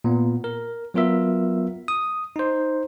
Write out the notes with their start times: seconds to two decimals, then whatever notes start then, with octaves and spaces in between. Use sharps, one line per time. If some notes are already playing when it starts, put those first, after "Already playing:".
0.04 A#2 B3
0.44 A#4
0.94 F#3 B3 F4 A#4 E5
1.88 D#6
2.36 D#4 C5